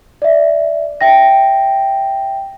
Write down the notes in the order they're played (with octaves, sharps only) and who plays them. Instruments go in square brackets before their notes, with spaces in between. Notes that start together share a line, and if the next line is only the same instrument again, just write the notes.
[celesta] D5 E5
E5 G5 A#6